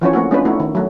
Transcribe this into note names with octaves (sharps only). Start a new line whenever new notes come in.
E3 F3 C#4 C#5
A3 A#3 C4 F#4
G#3 B3 C#4 D4 F4 B4
A3 D#4 E4 F#4
D#3
F#3 A3